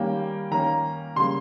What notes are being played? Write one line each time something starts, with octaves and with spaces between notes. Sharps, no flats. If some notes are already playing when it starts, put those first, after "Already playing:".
Already playing: D#3 G3 A#3 C#4 G5
D#3 A#3 C#4 A#5
C#3 G3 A#3 C6